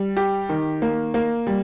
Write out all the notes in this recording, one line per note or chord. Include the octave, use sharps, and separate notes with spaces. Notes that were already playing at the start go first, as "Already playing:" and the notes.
Already playing: G3
G4
D#3
A#3
A#3
G3